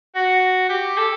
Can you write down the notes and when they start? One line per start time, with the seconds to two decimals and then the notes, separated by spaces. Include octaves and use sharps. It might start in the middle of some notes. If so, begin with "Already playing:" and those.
0.15 F#4
0.70 G4
0.98 A4